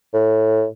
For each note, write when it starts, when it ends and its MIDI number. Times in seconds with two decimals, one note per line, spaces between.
0.14 0.65 45